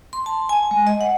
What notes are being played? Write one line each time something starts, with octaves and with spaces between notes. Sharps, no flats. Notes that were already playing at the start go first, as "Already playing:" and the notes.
C6
A5
G#5
G#3
D#5
F#5